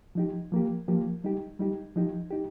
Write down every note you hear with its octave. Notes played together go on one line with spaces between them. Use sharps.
F3 D#4 G4
F3 A#3 G4
F3 A#3 G4
G3 D#4 G4
G3 D#4 G4
F3 D#4 G4
D#4 G4